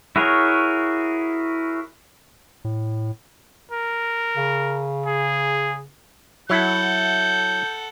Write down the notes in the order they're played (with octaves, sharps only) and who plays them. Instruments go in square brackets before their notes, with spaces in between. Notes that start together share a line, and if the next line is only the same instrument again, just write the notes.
[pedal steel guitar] E4 F#4 G#4 A#4 C#5
[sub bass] A2
[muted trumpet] A#4
[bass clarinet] C#3
[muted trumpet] G#4
[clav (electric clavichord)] F#3 E4 [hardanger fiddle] A4 F#5 [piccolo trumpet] G6